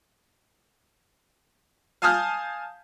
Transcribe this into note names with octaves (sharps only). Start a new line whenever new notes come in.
F5 G#5 A5 D#6 F6 G6